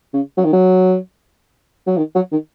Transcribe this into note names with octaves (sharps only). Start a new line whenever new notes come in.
C#3
F#3
D#3
F#3
F#3
D#3
F#3
D#3